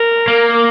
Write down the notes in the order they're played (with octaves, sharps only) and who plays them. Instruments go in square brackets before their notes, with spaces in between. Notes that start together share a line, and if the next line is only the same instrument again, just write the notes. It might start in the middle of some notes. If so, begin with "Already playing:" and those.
Already playing: [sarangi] A#4
[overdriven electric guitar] A#3